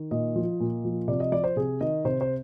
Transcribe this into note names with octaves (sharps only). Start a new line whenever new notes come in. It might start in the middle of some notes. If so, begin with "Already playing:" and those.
Already playing: D#3
A#2 D#5
F3
A#2
F3
C3 D5
D#5
F3 D5
C5
C3 G#4
D#3 D#5
C3 C5
C5